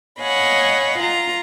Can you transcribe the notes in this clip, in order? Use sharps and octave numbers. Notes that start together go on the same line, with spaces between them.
C#5 D#5 F5 F#5 G#5 B5
F4 A#5